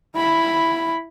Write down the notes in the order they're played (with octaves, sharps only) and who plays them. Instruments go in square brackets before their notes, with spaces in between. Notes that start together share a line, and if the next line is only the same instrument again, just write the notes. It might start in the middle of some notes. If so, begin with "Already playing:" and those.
[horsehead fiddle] E4 B5